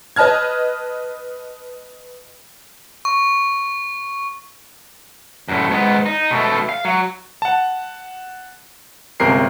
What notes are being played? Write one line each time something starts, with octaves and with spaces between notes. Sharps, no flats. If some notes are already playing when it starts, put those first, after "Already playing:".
B4 D#5 A5 F6 G#6
C#6
F#2 A2
G#2 B3
D#4
B2 A3
F5
F#3
F#5 A5
G1 C#2 C3 A#4 C7